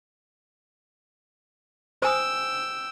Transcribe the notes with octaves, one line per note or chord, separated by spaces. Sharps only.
C5 G5 G#5 D#6 E6